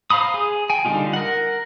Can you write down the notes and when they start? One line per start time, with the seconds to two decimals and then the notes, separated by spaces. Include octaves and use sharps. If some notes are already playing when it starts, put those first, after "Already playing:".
0.10 C5 F5 A#5 B5 D#6
0.34 G#4
0.70 G5 G#5
0.85 D3 G3 C#4 D#4 F4
1.13 A#4 F#5